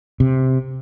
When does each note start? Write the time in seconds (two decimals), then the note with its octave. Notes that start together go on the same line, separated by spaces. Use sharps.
0.20 C3